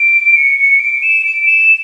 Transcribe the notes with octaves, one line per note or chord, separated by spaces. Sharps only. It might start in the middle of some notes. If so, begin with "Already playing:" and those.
Already playing: D7
C#7
C#7
D7
E7
D7
D7
E7